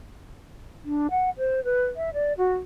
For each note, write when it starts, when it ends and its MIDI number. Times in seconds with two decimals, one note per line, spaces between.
0.85 1.07 62
1.11 1.30 78
1.38 1.64 72
1.64 1.84 71
1.96 2.13 76
2.13 2.33 74
2.38 2.54 66